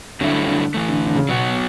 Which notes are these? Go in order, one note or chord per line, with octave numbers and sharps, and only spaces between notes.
G2 D3 F#3 A3 E4
D3
A2 E3 A3
D3
D3
C#3
B2 F#3 B3 F#4